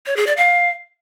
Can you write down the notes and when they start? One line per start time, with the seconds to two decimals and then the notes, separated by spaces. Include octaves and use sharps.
0.06 C#5
0.17 G#4
0.27 D5
0.37 F5